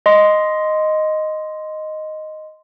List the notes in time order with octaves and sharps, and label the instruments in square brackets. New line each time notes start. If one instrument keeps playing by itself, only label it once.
[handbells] D#5 C6